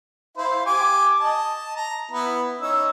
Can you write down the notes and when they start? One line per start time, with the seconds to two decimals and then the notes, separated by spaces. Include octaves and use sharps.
0.37 E4 C5 F5
0.66 G4 G#5 D6
1.20 D#5 A5
1.76 A#5
2.11 B3 E4
2.61 C#4 D#4 E6